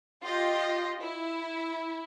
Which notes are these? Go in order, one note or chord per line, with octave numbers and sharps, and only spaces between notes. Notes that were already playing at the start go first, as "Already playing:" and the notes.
F4 G4 D#5
E4